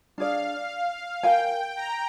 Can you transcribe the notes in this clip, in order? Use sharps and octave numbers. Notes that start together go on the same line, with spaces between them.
D4 G#4 D5 F5
A#4 F5 G5 G#5
A#5